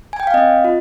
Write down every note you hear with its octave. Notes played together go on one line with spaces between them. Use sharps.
G#5
G5
F5
C4 D#5
F4